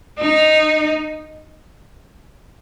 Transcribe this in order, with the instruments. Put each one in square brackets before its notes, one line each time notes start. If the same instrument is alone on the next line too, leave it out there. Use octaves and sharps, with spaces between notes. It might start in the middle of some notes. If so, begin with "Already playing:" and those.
[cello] D#4